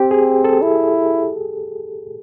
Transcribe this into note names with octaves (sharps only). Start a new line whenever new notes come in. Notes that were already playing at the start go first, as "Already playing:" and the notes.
Already playing: C4 G4
G#4
A4
E4